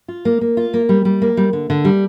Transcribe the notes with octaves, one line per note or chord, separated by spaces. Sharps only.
F4
A#3
A#3
F4
A#3
G3
G3
A#3
G3
D3
D3
G3